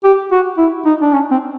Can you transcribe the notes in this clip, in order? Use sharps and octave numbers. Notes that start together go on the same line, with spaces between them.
G4
F#4
E4
D#4
D4
C#4
C4